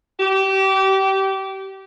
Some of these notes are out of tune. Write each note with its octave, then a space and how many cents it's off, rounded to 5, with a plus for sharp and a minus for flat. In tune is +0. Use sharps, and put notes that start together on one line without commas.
G4 -25